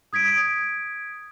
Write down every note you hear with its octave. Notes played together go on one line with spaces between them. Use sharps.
D#6 G#6 B6 D7